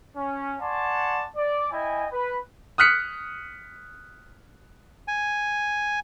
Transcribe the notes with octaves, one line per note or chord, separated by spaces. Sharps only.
C#4
D5 F#5 G#5 A5 C6 C#6
D5
E4 D#5 G5 G#5
B4
D#6 F6 F#6 B6 C#7
G#5